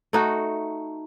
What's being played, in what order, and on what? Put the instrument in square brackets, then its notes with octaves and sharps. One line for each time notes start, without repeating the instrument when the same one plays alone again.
[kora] A3 D#4 F#4